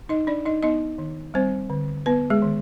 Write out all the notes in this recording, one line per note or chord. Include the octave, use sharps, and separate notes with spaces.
D#4 D#5
D4 D5
D#4 D#5
B3 D#4 D#5
D#3
G3 C4 C5
D3
B3 B4
G#3 G#4
D#3